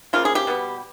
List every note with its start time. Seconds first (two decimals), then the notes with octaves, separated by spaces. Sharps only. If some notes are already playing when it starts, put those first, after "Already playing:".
0.13 C#3 F3 A#3 F4
0.25 G#4
0.35 G4
0.47 B2 G3 B3